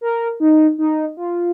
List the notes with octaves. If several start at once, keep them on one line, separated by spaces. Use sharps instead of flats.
A#4
D#4
D#4
F4